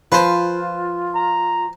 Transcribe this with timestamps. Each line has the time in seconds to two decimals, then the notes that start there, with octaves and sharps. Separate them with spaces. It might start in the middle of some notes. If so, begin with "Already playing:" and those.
0.12 F3 F4 B4 C5
1.15 A#5